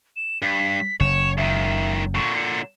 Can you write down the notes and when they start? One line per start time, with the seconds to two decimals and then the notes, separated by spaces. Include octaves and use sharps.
0.16 E7
0.42 G2 B6
1.00 F#1 C#3 C#5 E7
1.38 C#2 D#3 E5
2.15 A#2 D3 C#6
2.36 C#7